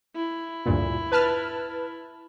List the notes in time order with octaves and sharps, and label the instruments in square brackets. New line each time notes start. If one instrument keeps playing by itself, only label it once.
[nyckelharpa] E4
[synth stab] D2 G2 A#2
B4 A5 F6